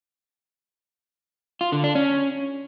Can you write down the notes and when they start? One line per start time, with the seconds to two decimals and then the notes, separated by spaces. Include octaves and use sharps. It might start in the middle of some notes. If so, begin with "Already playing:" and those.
1.61 F4
1.72 D3
1.84 D4
1.95 C#4